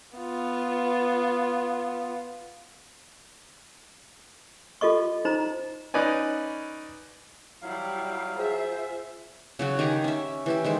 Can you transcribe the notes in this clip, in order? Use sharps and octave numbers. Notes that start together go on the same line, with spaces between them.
B3 F4
F4 A4 D#5 C#6
D#4 C5 A#5
C#4 D#4 B4 D5 G#5
F#3 G3 E4 F5
F4 G#4 C5 E5
C#3 F#3 F#4
D#3 G4 G#5 A#5
C#4 E5
E3 G4 E5
D#3 G#3 C5